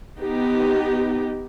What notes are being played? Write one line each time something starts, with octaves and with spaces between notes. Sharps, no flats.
B3 D#4 G4